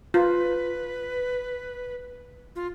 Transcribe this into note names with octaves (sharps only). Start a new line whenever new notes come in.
F4 B4
F4